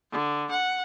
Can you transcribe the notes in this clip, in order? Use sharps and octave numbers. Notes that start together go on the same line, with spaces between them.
D3
F#5